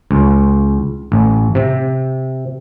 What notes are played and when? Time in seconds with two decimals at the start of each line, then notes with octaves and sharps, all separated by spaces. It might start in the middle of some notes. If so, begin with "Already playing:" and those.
0.11 C#2
1.12 A1
1.55 C3